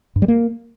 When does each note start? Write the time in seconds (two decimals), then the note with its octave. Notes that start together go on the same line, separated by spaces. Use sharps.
0.16 G2
0.22 G3
0.28 A#3